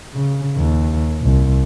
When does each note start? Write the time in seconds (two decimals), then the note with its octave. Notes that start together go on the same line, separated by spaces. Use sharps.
0.14 C#3
0.57 D#2
1.22 C2